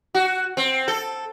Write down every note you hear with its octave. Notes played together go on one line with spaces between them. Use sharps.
F#4
C4
A4